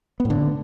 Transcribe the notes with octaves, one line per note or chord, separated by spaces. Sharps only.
B3
A2
D3